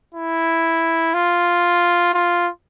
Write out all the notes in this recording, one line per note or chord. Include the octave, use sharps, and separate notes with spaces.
E4
F4
F4